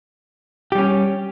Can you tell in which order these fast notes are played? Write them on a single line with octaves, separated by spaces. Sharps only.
G4 G3 C#4